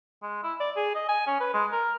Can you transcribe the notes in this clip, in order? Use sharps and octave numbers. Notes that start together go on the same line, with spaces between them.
G#3
E4
D5
G#4
D#5
G#5
C#4
B4
G#3
A#4